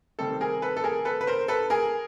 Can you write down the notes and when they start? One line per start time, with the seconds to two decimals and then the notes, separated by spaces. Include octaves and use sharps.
0.19 C3 D#3 G3 C4 A4
0.41 G#4 A#4
0.62 A4 B4
0.77 A4
0.84 G#4 A#4
1.05 A4 B4
1.21 B4
1.27 A#4 C5
1.48 A4 B4
1.70 G#4 A#4